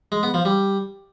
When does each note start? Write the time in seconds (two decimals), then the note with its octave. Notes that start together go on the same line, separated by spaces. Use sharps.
0.12 G#3
0.23 B3
0.34 F3
0.45 G3